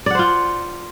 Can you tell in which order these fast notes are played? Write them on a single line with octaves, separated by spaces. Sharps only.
D5 F#5 C5 F4